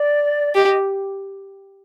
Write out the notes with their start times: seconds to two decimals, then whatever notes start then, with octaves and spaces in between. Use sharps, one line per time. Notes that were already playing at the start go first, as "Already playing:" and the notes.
Already playing: D5
0.55 G4 D#5
0.65 D#5